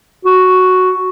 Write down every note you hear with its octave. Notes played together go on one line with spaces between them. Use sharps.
F#4